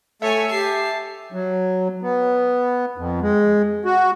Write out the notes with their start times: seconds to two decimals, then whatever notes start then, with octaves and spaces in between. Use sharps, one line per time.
0.22 A3 A4 C#5 E5 G#5
0.51 G4 A5 C7
1.32 F#3
2.02 B3
2.98 F2
3.22 G#3
3.85 F#4